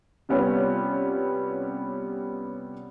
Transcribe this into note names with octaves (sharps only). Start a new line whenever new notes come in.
C3 G3 B3 C#4 F4